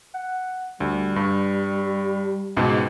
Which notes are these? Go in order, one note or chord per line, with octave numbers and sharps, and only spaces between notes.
F#5
D2 G3
G2
C#2 G#2 B2